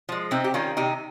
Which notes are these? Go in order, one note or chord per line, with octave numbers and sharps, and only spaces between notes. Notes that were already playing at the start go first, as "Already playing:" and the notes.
F3 G#3
C3 C4 D#4
G4
D#3 G3 C#4 F4
C3 D#4 G4